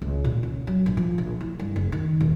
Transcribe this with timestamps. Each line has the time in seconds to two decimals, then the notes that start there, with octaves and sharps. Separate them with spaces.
0.02 C#2
0.24 A#2
0.43 C#4
0.67 F#3
0.86 A#1
0.97 F3
1.18 A#1
1.41 E4
1.59 G2
1.76 F#1
1.92 D#3
2.21 D#1